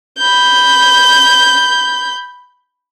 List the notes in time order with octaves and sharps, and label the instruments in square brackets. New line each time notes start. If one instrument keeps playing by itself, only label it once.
[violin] B5 G6